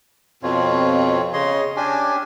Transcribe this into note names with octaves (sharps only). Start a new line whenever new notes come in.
F2 B2 C4 F4 C#5
C#3 C#5 D#5 C6
C#4 D4 G4 G#5